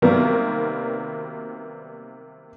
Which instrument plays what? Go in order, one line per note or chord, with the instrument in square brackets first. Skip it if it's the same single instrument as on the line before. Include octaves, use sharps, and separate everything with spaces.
[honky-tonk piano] C3 D#3 F#3 G3 A#3 B3